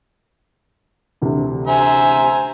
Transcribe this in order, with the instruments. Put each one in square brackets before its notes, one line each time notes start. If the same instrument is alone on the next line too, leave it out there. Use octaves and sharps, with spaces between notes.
[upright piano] D2 C3 E3
[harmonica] C5 E5 A#5 [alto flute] G#5